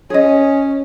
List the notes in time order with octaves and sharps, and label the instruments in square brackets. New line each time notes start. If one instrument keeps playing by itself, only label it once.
[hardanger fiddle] C#4 [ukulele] G#4 D#5